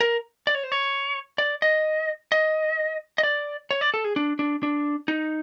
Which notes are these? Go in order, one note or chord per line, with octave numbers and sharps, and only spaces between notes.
A#4
D5
C#5
C5
C#5
D5
D#5
D#5
D#5
D5
C#5
D5
A4
G#4
D4
D4
D4
D#4